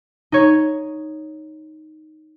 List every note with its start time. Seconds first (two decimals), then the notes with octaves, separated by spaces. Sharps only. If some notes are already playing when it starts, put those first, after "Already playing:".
0.32 D#4 C#5